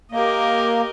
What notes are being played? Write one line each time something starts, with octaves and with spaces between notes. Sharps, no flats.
A#3 G4 A#4 D#5